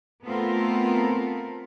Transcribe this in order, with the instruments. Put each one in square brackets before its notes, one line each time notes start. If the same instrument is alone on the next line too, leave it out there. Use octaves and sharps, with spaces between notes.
[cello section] A3 B3 C4 F4 A4 A#4